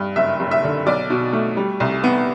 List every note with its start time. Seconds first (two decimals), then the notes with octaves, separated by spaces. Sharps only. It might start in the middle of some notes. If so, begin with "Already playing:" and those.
Already playing: G2
0.16 F#1 E5
0.40 F#1
0.51 E5
0.64 D3
0.86 B1 D5
1.10 B2
1.33 A3
1.57 G3
1.80 C2
2.04 B3